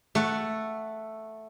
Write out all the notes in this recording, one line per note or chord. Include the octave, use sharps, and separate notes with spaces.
A3 F#5